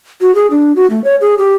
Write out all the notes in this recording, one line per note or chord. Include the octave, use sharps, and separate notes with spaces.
F#4
G#4
D4
F#4
A3
C#5
G#4
G4